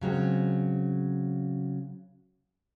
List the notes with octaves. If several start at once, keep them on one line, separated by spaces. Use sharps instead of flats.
C#3 F#3 G#3 C4